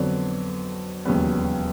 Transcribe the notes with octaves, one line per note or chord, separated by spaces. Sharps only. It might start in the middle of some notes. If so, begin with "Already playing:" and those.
Already playing: F2 D3 F#3 B3 D4
E1 D#2 C#3 F#3 B3